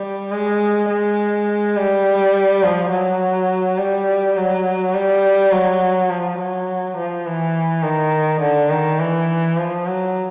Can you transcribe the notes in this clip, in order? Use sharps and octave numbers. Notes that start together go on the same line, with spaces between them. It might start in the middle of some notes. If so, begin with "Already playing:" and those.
Already playing: G3
G#3
G#3
G3
F3
F#3
G3
F#3
G3
F#3
F3
F#3
F3
E3
D#3
D3
D#3
E3
F3
F#3